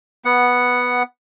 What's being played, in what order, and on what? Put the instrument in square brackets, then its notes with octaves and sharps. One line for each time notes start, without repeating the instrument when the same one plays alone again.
[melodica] B3 F#5